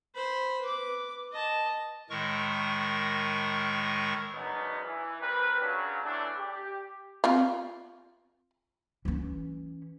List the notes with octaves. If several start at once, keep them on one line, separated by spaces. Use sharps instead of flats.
C5 B5
B4 D6
D#5 A5
A2 D#3 G#3 A#4 C#6
F#2 C#3 F#3 B3 D4 D#4
E3
G3 C4 A#4 B4
C#3 F#3 D4
E3 F#3 A3 D4
G4
C4 F4 F5
E3 C#4